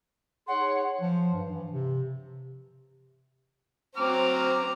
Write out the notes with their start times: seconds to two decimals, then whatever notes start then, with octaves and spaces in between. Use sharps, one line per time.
0.47 D#4 G#4 C#5 F#5 C6
1.02 F3
1.34 G2
1.51 E3
1.71 C3
3.97 F#3 C4 C5 A#5 D6 F6